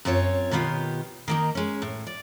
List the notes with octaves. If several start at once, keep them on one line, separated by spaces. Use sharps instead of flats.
F#2 C4 F4 A#4 C#5
B2 D#3 B3 F4 G4
D#3 A#3 D#4
G#3 C#4
A2
D5